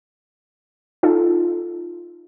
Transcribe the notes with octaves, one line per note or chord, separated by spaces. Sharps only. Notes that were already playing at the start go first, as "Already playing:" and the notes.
D#4 F4 A4